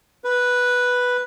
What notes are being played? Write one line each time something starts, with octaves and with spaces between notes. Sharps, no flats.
B4